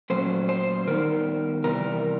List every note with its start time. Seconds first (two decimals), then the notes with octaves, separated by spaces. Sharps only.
0.10 A#2 F#3 A3 C#4 C5
0.49 C5
0.87 D#3 G3 B3 D#4 A#4
1.64 C3 E3 G3 A#4